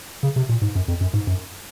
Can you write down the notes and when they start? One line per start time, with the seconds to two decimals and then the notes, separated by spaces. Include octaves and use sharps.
0.23 C#3
0.36 C3
0.49 A#2
0.62 G#2
0.75 F#2
0.88 F2
1.01 F#2
1.13 G#2
1.27 F#2